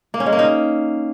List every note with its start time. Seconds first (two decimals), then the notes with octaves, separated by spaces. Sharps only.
0.14 A#3
0.20 C#4
0.26 G#3
0.33 A#3
0.39 D#4